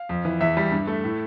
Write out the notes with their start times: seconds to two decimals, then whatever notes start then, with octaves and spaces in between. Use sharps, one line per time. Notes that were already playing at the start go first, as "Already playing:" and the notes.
Already playing: F5
0.09 F2
0.25 E3
0.41 E2 E5
0.57 G3
0.72 G2
0.87 A3
1.04 A2